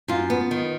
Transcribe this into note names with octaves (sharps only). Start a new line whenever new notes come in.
F#2 F4
B3
D#3